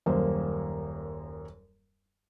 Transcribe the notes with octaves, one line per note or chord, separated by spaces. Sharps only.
D#1 F#2 A#3 C5